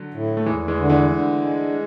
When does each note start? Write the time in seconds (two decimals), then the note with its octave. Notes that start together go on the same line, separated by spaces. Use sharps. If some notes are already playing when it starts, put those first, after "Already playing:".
Already playing: D3 F#3
0.14 A2
0.37 A3
0.46 E2 E3 G#3
0.68 E3 G#3
0.79 D3
0.90 E3 G#3
1.11 D3
1.44 G#3